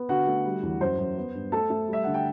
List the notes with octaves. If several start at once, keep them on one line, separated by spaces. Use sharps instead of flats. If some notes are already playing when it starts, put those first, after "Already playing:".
Already playing: B3
D3 F#4 F#5
A3
G3
E2
F#2 C5
F#2
B3
G2
A3 A4 A5
A3
G3 E5
D3 F#5
G5